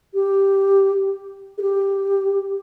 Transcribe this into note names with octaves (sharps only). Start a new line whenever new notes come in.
G4
G#4
G4